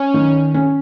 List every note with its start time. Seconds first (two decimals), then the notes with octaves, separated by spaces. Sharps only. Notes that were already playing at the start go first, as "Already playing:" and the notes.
Already playing: C#4
0.14 D#3
0.54 C#4